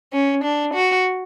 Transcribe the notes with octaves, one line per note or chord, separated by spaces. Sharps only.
C#4
D4
F#4